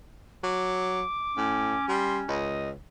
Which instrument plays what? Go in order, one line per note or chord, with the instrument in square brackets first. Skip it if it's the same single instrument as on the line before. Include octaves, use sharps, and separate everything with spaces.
[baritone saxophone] F#3 [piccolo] D6
[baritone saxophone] A2 [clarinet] C#4
[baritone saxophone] G3 [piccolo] C6
[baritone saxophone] C#2 [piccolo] D#5